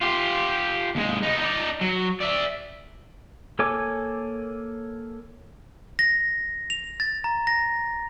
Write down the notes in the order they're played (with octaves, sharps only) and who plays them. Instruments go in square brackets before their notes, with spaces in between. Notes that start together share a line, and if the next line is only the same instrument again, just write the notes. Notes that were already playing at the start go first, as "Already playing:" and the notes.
[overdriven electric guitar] F4 G4
D#2 G#3
B3 D#4
D#4 D5
F#3
D5 E5
[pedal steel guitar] A#3 A4 C#5 G#5 D6
[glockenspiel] A#6
F7
A6
A#5
A#6